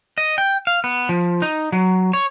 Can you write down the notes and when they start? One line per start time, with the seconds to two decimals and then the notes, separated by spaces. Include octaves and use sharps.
0.18 D#5
0.38 G5
0.67 F5
0.84 B3
1.09 F3
1.42 D#4
1.72 F#3
2.13 C#5